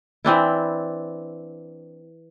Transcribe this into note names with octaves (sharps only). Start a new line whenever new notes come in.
E3 C4 D4 E4